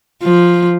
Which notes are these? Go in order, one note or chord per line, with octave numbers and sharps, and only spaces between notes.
F3